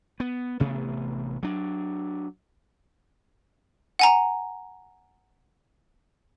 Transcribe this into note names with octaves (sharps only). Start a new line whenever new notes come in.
B3
A1 C3 A3 B3
F#3 D4
F#5 G#5 A#5